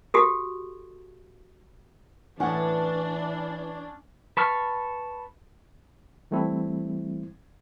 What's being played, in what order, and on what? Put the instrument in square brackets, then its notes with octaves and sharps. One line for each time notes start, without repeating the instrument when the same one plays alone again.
[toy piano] F#4 G4 A4
[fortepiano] A2 F#5 [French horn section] E3 [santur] C#4 [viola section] D4
[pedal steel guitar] B4 A5 C#6 F6
[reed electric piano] E3 G3 A3 C4 E4